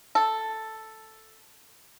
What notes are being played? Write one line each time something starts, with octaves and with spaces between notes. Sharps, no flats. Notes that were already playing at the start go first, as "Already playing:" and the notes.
A4